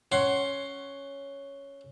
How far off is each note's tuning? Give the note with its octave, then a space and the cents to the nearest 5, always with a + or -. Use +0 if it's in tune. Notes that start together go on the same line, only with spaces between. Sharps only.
C#4 +0 F#5 +15 C6 +10